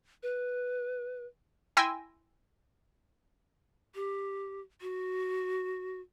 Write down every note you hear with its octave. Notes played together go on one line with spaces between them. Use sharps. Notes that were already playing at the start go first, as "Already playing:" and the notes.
B4
E4 G5 G#5 C6 E6 A#6
G4
F#4